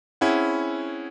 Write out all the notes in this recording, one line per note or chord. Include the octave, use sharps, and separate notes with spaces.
C4 C#4 E4 G#4 F#5